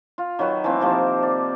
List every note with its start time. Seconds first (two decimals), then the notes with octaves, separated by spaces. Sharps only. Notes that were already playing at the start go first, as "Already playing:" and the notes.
0.18 F4
0.39 D#3 F#3 F#4 B4
0.64 E3 A3 A#3 C4
0.80 C3 D#3 F3 A#3
1.23 D5